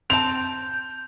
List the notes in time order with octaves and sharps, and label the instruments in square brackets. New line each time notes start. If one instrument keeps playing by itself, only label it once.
[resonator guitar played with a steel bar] C4 A5 [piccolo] G6 [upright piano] F7